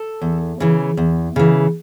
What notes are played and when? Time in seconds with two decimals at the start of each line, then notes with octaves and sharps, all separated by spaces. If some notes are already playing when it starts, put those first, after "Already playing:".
Already playing: A4
0.22 E2
0.60 C#3 E3
0.97 E2
1.36 C#3 E3